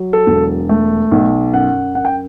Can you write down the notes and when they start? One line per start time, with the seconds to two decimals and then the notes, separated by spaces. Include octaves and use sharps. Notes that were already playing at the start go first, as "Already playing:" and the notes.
Already playing: F#3
0.13 A4
0.27 E1
0.69 A3
1.11 B1
1.53 F#2 F#5
1.95 F#2 F#5
2.05 G5